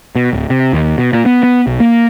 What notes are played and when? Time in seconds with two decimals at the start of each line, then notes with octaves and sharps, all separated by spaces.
0.15 B2
0.33 D1
0.50 C3
0.73 D#2
0.98 B2
1.13 A#2
1.26 B3
1.43 B3
1.67 B1
1.80 A#3